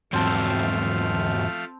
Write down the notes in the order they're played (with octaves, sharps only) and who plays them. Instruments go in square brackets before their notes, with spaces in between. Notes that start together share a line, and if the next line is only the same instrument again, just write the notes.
[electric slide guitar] E2 G#2 F#3 [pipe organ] F3 A3 F5 [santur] C4 A5